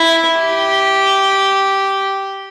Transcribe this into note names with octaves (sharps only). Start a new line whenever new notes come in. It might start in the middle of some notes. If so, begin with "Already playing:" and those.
Already playing: E4
G4